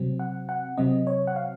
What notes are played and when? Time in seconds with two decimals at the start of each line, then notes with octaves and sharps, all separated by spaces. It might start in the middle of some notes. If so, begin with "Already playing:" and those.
Already playing: C3 F#3 C4
0.19 F#5
0.49 F#5
0.77 C3 F#3 C4 D#5
1.07 C#5
1.27 F#5
1.36 F5